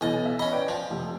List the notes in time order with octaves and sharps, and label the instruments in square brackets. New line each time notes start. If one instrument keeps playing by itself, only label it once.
[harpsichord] B1 D#5 [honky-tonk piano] E3 G#5 A6
[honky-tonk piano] E5
[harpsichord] C#4 D#5 [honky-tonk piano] B5
[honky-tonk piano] B4 D5 G5
[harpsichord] F3 [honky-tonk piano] D5 G#5
[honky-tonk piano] F1 F2